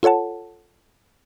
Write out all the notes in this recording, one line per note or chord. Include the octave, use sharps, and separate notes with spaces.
F4 A4 C#5 F#5 A5